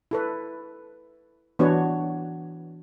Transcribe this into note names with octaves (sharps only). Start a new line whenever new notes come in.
E4 A4 B4
E3 B3 D4 F#4 C#5